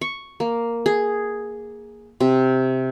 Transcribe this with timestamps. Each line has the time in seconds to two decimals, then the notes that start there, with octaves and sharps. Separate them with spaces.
0.01 C#6
0.40 A#3
0.86 G#4
2.20 C3